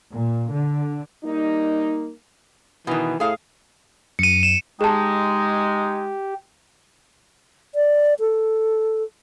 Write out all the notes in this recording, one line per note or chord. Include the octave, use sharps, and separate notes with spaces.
A#2
D3
G3 A#3 D#4
B2 D#3 E3
A2 G#4 F5
F#2 C#7 D#7
E7
G#3 D#4 G4 G#4 A5
D5
A4